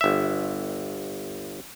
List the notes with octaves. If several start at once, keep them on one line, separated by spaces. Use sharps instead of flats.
G1 E5